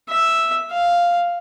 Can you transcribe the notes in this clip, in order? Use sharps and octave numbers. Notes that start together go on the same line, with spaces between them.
E5
F5